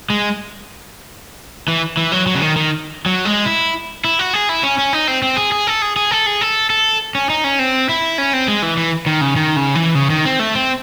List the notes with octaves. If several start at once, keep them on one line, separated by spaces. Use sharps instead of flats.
G#3
E3
E3
F#3
F#3
C#3
D#3
D#3
F#3
G#3
E4
E4
F#4
G#4
E4
C#4
C#4
D#4
C4
C4
G#4
G#4
A4
G#4
G#4
A4
G#4
A4
A4
C#4
D#4
C#4
C4
E4
C#4
C4
G#3
E3
E3
D#3
C#3
D#3
C#3
E3
C#3
D#3
C4
A3
C4